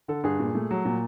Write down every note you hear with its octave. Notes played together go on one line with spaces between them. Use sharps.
D3 A4
G2 G#4
A#2
A3
F#3
A#2